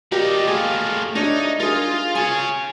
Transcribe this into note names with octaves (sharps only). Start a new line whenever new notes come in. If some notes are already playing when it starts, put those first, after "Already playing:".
D#4 G4 A#4 D5
A2 F4 G#4
D4 D#4 C#5 E5
F4 G#4 A#4
G#4 C#5 G#5